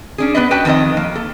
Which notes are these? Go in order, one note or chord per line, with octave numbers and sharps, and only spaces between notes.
C#4 D4 G#4
B3 B4 D5 D#5
F#4 B4 G5 A5
F2 D#3 B3 A4 D#5
A#3
A4